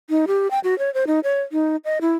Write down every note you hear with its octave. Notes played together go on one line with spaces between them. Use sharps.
D#4
G4
G5
F#4
C#5
C5
D#4
C#5
D#4
D#5
E4